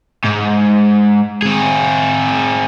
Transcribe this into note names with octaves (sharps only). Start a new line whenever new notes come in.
G#2
C4 G#4